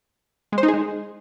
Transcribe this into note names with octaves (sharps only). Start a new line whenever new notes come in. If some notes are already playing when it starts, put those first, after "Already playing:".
G#3
C5
D#4
G#4
G#3